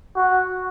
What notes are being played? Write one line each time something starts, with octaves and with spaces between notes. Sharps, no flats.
F#4